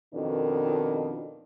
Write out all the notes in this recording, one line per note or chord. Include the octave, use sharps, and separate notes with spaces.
F2 B2 D#3 D4 A#4